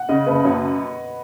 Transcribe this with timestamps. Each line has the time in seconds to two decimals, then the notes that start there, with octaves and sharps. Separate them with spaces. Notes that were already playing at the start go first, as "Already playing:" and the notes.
Already playing: F#5
0.09 C#3 D#5
0.26 F#1 B4
0.44 F#2 C#5